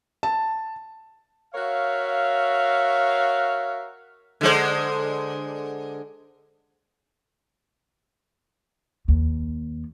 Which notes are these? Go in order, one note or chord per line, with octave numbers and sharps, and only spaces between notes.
A5
F#4 A#4 C#5 E5 F5
D3 G#3 C5
D#2